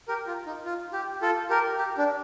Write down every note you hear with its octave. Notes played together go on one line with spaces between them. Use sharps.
G4 A#4
F4
D#4
F4
G4
F4 A4
G4 A#4
G4
D4